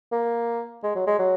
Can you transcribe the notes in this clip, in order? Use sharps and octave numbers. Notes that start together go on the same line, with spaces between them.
A#3
G#3
F#3
G#3
F#3